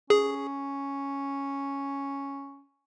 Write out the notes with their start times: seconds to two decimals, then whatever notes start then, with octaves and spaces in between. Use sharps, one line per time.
0.10 C#4 G#4